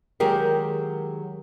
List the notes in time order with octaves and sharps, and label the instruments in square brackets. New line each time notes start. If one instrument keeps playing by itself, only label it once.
[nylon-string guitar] D#3 F#3 G#3 G4 G#4 A#4